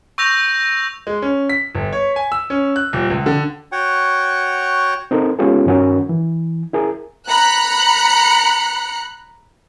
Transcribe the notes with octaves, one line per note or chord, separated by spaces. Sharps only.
C#6 E6 G6 A#6 F7
G#3
C#4
B6
G1
C#5
G#5
E6
C#4
F#6
D#1
C#2
D3
F#4 C#5 F#5 G5 C#6
C4 D#4 A4 A#4
G#3 B3 C#4 F4 G4 A4
G2 D#3 C#4 F#4 A#4
E3
E4 G#4 A#4
A#5 B5 F#6 C#7